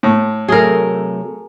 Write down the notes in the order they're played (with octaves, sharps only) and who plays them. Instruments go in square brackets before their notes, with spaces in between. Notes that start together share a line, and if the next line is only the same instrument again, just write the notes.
[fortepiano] A2
[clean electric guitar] C3 F#3 A3 [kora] G#4 A#4